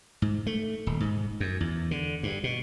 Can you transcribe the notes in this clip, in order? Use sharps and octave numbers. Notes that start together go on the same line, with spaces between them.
G#2
A3
D#1
G#2
F#2
E2
D3
G2
B2